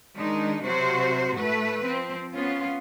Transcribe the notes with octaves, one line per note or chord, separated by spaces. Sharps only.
D#3 G#3 D4 D#4
C3 F#3 F#4 C5
A2 A3 B4
F3 C4
B3 C#4 F4